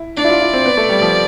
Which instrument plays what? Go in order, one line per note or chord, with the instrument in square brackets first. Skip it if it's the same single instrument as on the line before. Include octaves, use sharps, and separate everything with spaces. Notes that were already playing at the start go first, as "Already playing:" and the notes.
Already playing: [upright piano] E4
[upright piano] D4 [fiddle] D5
[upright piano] E4
F4
E4
C4
B3
A3
G3
F3